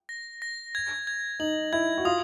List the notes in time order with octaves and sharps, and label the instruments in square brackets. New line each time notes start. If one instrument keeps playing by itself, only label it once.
[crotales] A#6
A#6
G#6
G#6
[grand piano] D#4 [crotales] F#7
[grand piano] E4 [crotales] G#6
[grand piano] F#4
[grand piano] F4 [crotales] D#6